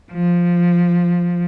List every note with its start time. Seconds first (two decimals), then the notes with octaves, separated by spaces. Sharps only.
0.12 F3